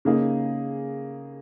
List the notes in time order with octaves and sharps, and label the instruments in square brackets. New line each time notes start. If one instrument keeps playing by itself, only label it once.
[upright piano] C#3 A#3 D#4 G#4